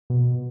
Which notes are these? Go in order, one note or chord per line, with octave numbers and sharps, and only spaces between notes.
B2